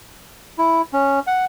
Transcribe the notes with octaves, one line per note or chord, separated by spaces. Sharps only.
E4
C#4
F#5